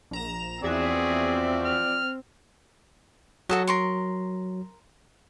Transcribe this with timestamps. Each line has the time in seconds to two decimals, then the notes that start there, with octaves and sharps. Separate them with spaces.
0.11 A#1 A#5 E7
0.63 E2 F3 C4 F#4 G#4 D5 E5
1.66 F6
3.49 F#3 F#4 A4 D#5
3.67 A#4 C6 C#6